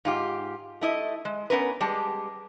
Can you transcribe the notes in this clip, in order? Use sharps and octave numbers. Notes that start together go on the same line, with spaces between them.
G#2 F4 G4
A3 E4 D#5
G#3
B3 C#4 A#4 B4
G3 G#3 G4 A5